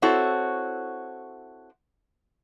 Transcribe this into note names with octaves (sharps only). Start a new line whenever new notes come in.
C4 E4 F#4 A4 C#5